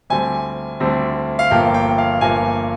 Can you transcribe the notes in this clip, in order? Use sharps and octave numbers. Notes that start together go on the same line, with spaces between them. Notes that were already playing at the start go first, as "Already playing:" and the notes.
D2 D3 G3 C4 G#5
D2 D3 G3 C4
F5
G1 G2 F3 A#3 G5
G5
F5
G1 G2 F3 A#3 G#5